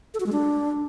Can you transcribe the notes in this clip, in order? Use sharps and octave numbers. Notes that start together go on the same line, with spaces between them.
A4
F#4
G#3
D4